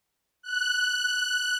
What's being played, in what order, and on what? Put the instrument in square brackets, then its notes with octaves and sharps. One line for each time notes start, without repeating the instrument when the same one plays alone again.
[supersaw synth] F#6